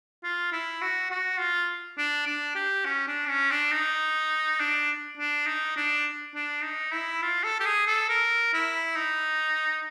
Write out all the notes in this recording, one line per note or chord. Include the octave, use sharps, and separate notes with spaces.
F4
E4
F#4
F#4
F4
D4
D4
G4
C#4
D4
C#4
D4
D#4
D4
D4
D#4
D4
D4
D#4
E4
F4
A4
G4
G#4
A4
A#4
E4
D#4